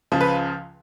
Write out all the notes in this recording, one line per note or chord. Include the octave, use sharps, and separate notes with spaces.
C#2 C#3 F3
B4